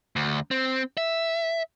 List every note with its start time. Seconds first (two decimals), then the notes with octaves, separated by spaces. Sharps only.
0.16 D2
0.51 C4
0.97 E5